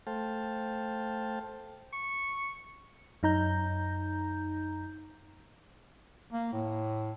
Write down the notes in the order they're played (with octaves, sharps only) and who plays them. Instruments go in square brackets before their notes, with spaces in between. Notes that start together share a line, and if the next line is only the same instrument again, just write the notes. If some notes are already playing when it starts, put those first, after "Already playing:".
[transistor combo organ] A3 A4 C5 F5 G5 A5
[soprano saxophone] C#6
[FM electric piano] F#2 D#4 A#5 G6
[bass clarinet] A#3
A2